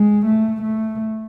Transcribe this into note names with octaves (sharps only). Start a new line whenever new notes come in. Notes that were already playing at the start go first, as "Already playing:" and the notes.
Already playing: G#3
A3
A3